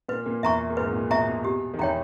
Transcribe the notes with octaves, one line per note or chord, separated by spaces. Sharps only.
A#2 A#3 B4
A#2 A#3
E2 E3 E5 A#5 C#6
A#3
G#2 G#3 B4
A#2
B2 E5 A#5 C#6
B2
B2 G4
D#3
E2 E3 C#5 G5 A#5